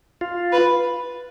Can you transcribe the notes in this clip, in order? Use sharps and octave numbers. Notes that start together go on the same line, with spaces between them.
F4
B4